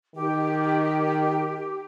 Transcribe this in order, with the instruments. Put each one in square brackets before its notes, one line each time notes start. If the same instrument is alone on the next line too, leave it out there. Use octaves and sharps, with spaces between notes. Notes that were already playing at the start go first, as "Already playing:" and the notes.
[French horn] D#3 [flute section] G4